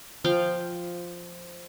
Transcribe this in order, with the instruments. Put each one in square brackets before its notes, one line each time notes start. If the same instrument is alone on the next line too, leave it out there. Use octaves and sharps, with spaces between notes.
[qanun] F3 F5 G5